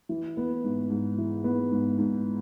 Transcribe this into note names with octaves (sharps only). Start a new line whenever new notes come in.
E3
B3
G#2
G#2
E3
B3
G#2
G#2